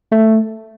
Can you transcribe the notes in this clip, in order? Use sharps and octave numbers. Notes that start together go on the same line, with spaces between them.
A3